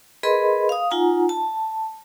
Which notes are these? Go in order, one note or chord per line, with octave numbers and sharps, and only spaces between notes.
G#4 A#4 B4 D#5 B5 C6
F5 D#6
D#4 F4 F#5 G#5 A#5
A5